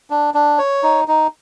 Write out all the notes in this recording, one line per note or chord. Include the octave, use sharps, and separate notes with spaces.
D4
D4
C#5
D#4
D#4